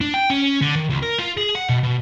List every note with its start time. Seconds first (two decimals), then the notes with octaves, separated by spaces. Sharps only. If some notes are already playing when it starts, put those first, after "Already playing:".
0.01 D4
0.14 G5
0.30 C#4
0.61 D3
0.75 D#3
0.89 C#2
1.02 A#4
1.18 F4
1.37 G#4
1.55 F#5
1.69 B2
1.83 B2